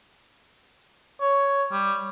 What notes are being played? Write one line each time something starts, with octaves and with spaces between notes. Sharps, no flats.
C#5
G3